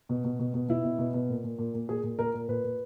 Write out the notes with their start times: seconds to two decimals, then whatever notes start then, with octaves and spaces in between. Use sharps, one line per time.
0.09 B2
0.25 B2
0.39 B2
0.54 B2
0.69 B2 E4
0.85 B2
0.99 B2
1.14 B2
1.29 A#2
1.44 A#2
1.58 A#2
1.74 A#2
1.89 A#2 G#4
2.03 A#2
2.19 A#2 A#4
2.34 A#2
2.49 A#2 B4
2.64 A#2